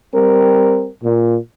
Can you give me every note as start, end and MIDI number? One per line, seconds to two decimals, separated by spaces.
0.13 0.87 55
0.13 0.87 60
0.13 0.87 70
1.02 1.36 46